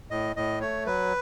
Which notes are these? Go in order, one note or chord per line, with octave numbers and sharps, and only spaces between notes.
A2 D#5
A2 D#5
A3 C#5
F#3 B4